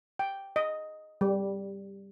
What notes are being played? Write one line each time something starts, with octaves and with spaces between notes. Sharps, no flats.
G5
D#5
G3